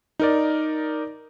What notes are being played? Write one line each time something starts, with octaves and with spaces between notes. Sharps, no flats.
D#4 A#4 D5